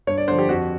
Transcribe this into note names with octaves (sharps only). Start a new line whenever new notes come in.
G2 C#5
D5
D3 F3 C5
G4
F2 F#4